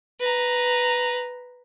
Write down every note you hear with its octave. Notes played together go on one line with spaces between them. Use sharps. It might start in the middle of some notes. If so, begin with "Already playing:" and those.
B4 A#5